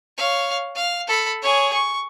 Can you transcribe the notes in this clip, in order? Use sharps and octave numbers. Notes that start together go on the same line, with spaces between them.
C#5 F5
F5
A4 B5
G#4 C#5
C#6